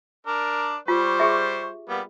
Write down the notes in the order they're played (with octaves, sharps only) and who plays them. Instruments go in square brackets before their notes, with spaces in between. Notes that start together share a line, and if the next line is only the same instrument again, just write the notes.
[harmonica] D4 A#4 D5
[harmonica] G3 C5 C#6 [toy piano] F4
[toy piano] G4 G#4 E5
[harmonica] G3 A#3 B3